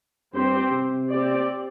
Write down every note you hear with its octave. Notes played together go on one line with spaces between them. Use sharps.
G2 C4 G4 C5
C3
C4 G4 D5